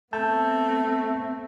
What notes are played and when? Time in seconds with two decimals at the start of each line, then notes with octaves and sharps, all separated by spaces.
0.13 A3 B3 C4 A5 G6